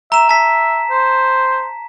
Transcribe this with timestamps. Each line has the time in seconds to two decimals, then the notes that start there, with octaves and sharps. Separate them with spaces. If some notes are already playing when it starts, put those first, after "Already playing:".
0.12 E5 A#5 E7
0.29 E5 A5 B6
0.91 C5